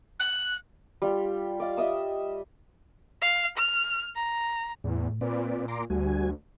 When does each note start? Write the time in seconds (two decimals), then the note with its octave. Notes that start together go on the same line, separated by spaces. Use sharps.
0.20 F#6
1.02 G3 F4
1.60 D5 D#5 F5
1.77 D#5 E5 D#6 E6
3.21 F5
3.57 F6
4.15 A#5
4.84 E2 A2
5.21 A#2 C4 B4 D5
5.68 A#5 C6 D6
5.90 D2 G3 F#4 G#5